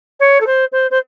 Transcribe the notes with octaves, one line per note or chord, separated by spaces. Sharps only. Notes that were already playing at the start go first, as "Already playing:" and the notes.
C#5
A4
C5
C5
C5